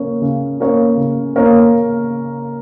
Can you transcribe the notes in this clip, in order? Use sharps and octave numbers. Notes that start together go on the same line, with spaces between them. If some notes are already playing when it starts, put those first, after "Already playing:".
Already playing: C#3 A#3 C#4 A#4 C#5
C#3
A#3 C#4 A#4 C#5
C#3
A#3 C#4 A#4 C#5